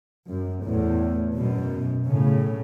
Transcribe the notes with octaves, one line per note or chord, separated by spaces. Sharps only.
F#2
E2 A2
F#2 B2
A2 C#3